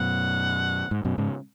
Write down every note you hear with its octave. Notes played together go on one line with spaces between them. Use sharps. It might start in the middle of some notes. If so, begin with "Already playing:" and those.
Already playing: F#2 B2 F#5
G#2
F#2 B2
G#2 C#3